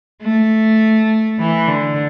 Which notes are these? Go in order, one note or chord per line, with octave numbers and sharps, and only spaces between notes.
A3
E3
D3